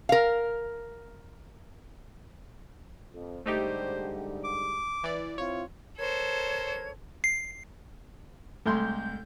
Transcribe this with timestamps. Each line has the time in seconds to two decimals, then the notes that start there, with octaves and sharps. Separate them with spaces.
0.09 A#4 F5
3.14 F2
3.46 G#2 D3 G3 A3 D#4 G4 C5
4.44 D6
5.04 E3 D5
5.38 C4 E4 F4 C#5
5.98 A4 A#4 C5 C#5 G#6
7.24 C7
8.66 C2 G#3 A3 C6 G6